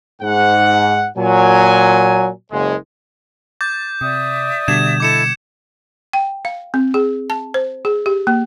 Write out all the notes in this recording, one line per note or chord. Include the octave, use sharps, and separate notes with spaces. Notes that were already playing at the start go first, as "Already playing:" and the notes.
G#2 F#5
A#2 F#3 G#5
F#1 G#3
D6 G6 A6
C3 D5 E5 D#6
B2 D3 G3 G#6 E7
E4 A4 D#5 D6 C#7 E7
G5
F5
C4
G#4
A5
C5
G#4
G4
A#3